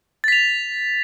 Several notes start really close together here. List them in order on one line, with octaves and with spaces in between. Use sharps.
A6 B6 F7